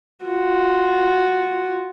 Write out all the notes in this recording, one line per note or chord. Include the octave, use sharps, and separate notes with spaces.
F4 F#4